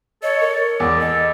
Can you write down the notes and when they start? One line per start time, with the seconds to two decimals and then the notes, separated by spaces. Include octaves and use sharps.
0.23 A4 C#5 D#5
0.41 A#4
0.80 E2 D5 E6
1.01 A4 D#5